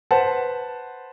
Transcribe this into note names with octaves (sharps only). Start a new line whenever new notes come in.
B4 C5 F#5 A5